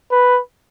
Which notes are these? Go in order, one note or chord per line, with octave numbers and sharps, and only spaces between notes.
B4